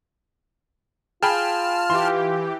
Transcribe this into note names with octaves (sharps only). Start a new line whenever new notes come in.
F4 G#4 G5 A5 B5 F6
E3 G4 C6